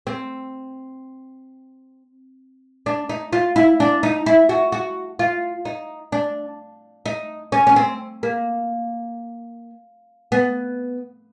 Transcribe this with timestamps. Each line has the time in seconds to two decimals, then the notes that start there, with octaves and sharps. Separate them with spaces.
0.07 C4
2.86 D4
3.09 D#4
3.33 F4
3.56 E4
3.80 D4
4.03 D#4
4.26 E4
4.49 F#4
4.72 F#4
5.19 F4
5.65 D#4
6.12 D4
7.06 D#4
7.52 C#4
7.67 C#4
7.76 C4
8.23 A#3
10.32 B3